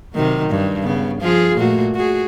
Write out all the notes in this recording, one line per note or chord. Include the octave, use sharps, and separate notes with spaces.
C3 D#3 F#3
G2
C#3 B3
F3 F4 G#4
A#2 A3 F#4
F#4 G#4